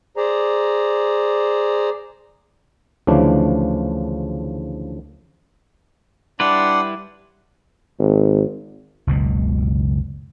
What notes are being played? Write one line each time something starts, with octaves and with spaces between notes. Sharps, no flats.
G#4 C5 D5 A#5
D2 C#3 E3 F3 D4
G3 D4 E4 B4 F#5 C6 D6
G#1
F#1 C#2 B2